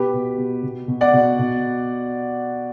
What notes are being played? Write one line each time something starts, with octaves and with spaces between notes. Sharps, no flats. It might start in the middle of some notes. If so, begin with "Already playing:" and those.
Already playing: B2 G4 B4
B2
B2
B2
B2
D5 F#5
B2
B2